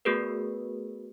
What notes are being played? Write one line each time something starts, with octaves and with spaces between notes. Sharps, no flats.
A3 B3 F#4 G#4 A#4 B4